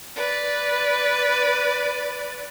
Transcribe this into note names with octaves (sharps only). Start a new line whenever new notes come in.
B4 D5